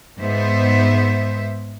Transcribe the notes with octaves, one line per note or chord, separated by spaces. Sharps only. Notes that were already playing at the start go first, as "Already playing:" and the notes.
G#2 B3 C5 E5